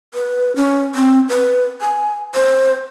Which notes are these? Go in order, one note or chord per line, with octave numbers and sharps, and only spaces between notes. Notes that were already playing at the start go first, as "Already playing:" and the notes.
B4
C#4
C4
B4
G#5
C5